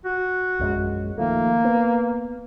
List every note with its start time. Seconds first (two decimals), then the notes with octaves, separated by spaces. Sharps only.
0.05 F#4
0.59 A#1 F#2 G#3
1.18 D#3 F3 A3 A#3
1.64 B3